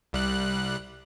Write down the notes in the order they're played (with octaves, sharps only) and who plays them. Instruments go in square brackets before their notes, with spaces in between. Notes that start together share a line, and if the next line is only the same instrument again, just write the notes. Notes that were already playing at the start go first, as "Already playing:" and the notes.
[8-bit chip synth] C2 G3 F#6